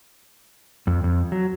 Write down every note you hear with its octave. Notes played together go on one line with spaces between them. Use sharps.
F2
F2
F#3